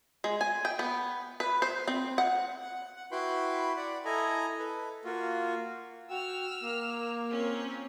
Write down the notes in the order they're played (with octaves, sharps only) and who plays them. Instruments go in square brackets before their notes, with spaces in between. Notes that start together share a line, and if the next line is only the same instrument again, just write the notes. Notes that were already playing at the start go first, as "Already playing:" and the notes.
[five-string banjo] G#3
G#5
G5
B3
B4
C5
C4
F#5
[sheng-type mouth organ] F#5
F#5
E4 F#4 B4 G5 B5 C6
D5 F#5 B5
E4 A4 D#5 G#5 A#5
A4 B4
A#3 F4 F#4
[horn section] F#4 G5 [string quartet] E6 F6
[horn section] A#3
[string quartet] C4 C#4 F4